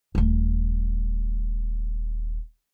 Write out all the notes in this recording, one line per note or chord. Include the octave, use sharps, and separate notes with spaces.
D#1 A3